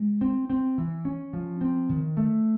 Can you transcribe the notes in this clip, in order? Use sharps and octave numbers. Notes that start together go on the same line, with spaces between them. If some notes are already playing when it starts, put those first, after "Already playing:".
Already playing: G#3
C4
C4
E3
C#4
F3
C4
D#3
A3